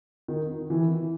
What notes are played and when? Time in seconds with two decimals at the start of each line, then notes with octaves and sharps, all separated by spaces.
0.28 D#3
0.70 E3